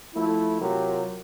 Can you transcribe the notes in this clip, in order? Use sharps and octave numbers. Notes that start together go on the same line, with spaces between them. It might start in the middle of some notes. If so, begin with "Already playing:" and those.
F3 A3 E4
C3 F#3 F4 G4 A#4